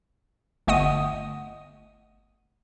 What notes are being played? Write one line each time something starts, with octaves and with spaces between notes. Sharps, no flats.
G1 A3 D#5 F#5 D#6 D#7